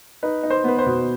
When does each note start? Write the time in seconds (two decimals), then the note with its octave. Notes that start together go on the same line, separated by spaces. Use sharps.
0.23 D#4 B4
0.43 D#4
0.50 C5
0.64 B3 B4
0.79 C5
0.86 B2